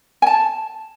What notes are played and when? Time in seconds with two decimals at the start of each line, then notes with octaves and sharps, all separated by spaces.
0.22 G#5
0.27 A5